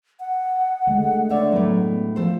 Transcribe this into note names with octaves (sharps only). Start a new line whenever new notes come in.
F#5
D3 G#3 A3
D3 D4 C#5 D5 E5
A2 F#3 B3
F3 A4 C5